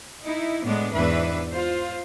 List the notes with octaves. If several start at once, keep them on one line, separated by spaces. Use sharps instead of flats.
D#4 E4
A2 G#3 B3 D4
E2 G#2 E3 D4 B4 E5
F4 C5